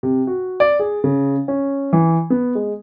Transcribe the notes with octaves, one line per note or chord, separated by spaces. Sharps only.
C3
F#4
D5
G#4
C#3
C#4
E3
B3
G#3